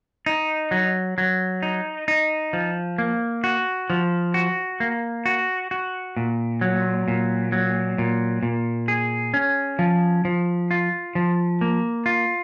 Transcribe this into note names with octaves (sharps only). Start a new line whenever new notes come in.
D#4
F#3
F#3
D#4
D#4
F3
A#3
F#4
F3
F#4
A#3
F#4
F#4
A#2
F#3
A#2
F#3
A#2
A#2
G#4
C#4
F3
F3
F4
F3
A#3
F4